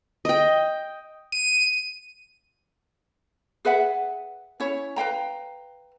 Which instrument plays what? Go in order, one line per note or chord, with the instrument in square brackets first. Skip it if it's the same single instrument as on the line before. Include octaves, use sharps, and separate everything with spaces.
[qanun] D#5 G5
[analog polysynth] D#7
[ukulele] G#4 B4 E5 F#5
C#4 E4 C#5
B4 F5 G5 A#5